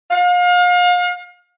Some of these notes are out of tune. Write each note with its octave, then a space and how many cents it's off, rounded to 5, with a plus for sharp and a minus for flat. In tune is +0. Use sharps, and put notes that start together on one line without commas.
F5 +35